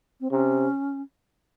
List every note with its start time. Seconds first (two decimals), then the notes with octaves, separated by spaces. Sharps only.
0.20 C4
0.30 C3 C#4